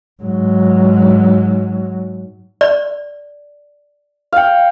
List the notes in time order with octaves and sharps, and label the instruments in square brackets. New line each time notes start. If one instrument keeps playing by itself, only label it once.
[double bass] G#2 F#3
[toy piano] D5
[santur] F5 G5